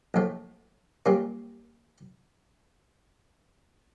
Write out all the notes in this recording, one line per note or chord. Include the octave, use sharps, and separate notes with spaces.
A#1 A2 F3 A3
A#2 G3 A#3 C#4 F4